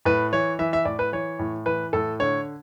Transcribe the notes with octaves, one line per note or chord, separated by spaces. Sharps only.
A2 B4
E3 C#5
E3 E5
E5
A2 D5
B4
E3 C#5
A2
E3 B4
A2 A4
D3 C#5